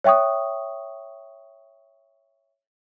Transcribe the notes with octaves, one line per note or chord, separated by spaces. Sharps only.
C#5 E5 G5 C#6 D#6